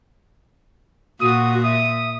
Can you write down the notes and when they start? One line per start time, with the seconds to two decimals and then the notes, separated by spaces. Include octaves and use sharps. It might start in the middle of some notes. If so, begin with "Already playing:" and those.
1.21 A#2 F#4 D#6
1.64 E5 D#6